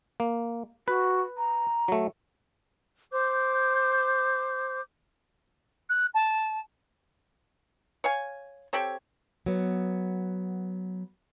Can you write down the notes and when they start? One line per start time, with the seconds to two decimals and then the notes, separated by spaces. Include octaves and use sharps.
0.20 A#3
0.88 F#4 B4
1.38 A#5
1.88 F#3 A3
3.11 C5 D6 G6
5.89 F#6
6.14 A5
8.04 C#5 F5 G#5
8.73 C4 G4 A4 C#5
9.46 F#3 B3